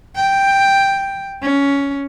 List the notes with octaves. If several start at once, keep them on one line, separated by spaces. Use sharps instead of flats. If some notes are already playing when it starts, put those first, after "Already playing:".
G5
C#4